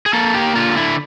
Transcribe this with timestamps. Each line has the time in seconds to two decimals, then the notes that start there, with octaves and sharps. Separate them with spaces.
0.06 G#4
0.13 A#3 A4
0.35 G4
0.56 D3 F4
0.77 E4